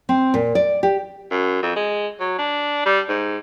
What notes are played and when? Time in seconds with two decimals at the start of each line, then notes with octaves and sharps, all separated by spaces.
0.09 C4
0.34 A#2
0.55 D5
0.83 G4
1.31 F#2
1.63 F2
1.76 G#3
2.20 F#3
2.38 D4
2.86 G3
3.08 G#2